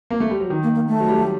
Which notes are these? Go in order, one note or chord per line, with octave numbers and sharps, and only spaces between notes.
A#3
A3
G3
F#3
D#3
A#3
A#3
A3
F#3
G3
F#3